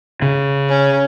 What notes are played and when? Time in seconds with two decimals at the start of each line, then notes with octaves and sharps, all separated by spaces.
0.22 C#3
0.70 C#4